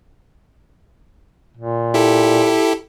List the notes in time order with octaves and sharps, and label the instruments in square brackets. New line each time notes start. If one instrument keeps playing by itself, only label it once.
[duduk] A#2
[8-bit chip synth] E4 G4 A4